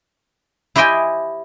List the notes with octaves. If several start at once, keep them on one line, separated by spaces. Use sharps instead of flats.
E4 G4 C5 D#5 G5 G#5